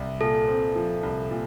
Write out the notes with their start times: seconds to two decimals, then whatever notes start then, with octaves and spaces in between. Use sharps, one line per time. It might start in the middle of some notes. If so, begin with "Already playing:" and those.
Already playing: C2
0.21 A#2 A4
0.48 C4
0.75 F3
1.03 C2
1.31 A#2